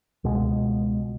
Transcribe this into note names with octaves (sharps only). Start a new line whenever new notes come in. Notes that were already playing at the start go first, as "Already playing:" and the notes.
C#2 B2 G#3